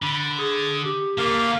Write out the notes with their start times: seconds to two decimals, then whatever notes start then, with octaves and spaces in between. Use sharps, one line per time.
0.02 D3 B5
0.38 G#4
0.85 G4
1.18 D3 A3 A#3 F5